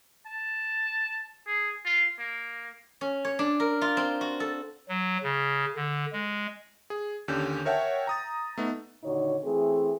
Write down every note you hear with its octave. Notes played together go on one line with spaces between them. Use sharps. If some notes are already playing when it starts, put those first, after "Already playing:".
A5
G#4
F4
A#3
C#4
C#5
D4
A#4
F4
C4
F#4
A4
F#3
C#3
D3
G#3
G#4
D#2 D3 C#4 G4 G6
A#4 C#5 E5 F#5 G5 A5
A#5 D#6 A6
A3 B3 D#4
D#2 A#2 D3 D#4 F#4 C#5
E3 A3 C4 G#4